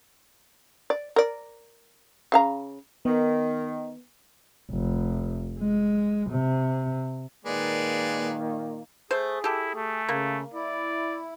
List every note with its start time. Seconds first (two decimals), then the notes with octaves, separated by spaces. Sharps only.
0.90 D5
1.16 A#4 D5
2.32 C#3 F5 A#5
3.05 D#3 B3
4.71 F1
5.59 G#3
6.30 C3
7.45 A#2 D#3 G#3 A#3 B4 D5
9.11 A3 G#4 C5
9.44 E4 G4 A4
9.75 A3
10.09 C#3 A#3
10.54 E4 D5